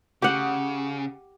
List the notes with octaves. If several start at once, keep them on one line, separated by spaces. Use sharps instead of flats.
C#3 G4 F#5